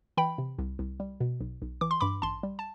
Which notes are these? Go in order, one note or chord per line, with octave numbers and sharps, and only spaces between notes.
E3 G5 B5
C3
C2
C2
G3
B2
B1
B1
E3 D6
C6
G2 B5 D6
A1 A5 C6
G3
A5